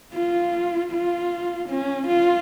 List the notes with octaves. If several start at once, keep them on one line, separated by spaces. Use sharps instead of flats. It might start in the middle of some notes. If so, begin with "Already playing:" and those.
F4
F4
C#4
F4